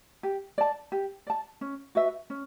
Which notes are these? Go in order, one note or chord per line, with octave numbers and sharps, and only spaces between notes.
G4
D5 A5
G4
D5 A5
C#4
F#4 B4 E5
C#4